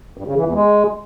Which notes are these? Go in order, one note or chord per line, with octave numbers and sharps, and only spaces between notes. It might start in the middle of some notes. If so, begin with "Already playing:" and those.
G2
C#3
E3
E2
G#3